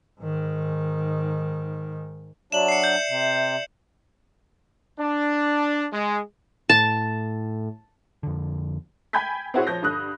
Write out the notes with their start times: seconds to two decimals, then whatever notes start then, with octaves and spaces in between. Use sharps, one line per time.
0.21 G#2 D#3
2.52 F#3 D4 D5 E5 E7 F#7
2.69 C7 C#7
2.84 G6
3.10 C3
4.99 D4
5.93 G#3
6.69 A2 A5
8.23 F2 D3
9.13 G5 G#5 B5 G6 G#6 B6
9.54 C4 E4 F#4 G#4 C5 C#5
9.67 F3 C#5 G6 A#6
9.82 G2 D3 D#6 F#6